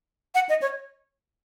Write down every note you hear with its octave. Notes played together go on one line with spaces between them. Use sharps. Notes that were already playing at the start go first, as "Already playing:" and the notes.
F#5
D#5
C#5